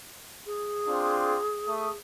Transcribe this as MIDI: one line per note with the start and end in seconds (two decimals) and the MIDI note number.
0.47 1.97 68
0.88 1.38 60
0.88 1.38 62
0.88 1.38 65
1.68 1.90 57
1.68 1.90 87